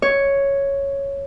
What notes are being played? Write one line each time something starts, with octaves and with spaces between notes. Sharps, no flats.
C#5